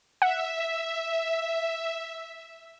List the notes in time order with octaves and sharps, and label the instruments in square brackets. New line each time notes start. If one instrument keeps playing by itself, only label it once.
[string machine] E5 [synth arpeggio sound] F#5